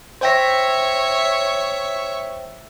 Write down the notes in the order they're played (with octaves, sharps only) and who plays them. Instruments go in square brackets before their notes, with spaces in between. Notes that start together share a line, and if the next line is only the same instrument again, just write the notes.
[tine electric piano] C5 G5 A#6 [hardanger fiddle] C#5 E5